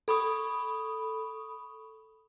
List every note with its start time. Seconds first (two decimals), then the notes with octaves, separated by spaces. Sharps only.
0.08 A4 B5 C#6 D#6